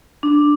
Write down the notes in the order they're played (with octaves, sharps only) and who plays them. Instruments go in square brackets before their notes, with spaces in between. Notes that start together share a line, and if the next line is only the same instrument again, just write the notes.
[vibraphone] D4